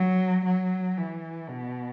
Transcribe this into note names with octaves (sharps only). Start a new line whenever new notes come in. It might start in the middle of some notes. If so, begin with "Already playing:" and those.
Already playing: F#3
F#3
E3
B2